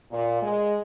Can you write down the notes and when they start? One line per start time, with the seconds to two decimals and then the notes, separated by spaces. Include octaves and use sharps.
0.11 A#2
0.41 G#3